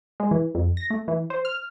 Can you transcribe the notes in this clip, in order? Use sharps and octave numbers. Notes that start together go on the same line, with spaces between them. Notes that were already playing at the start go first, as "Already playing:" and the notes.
G#3
E3
F2
A#6
A3
E3
C5
F6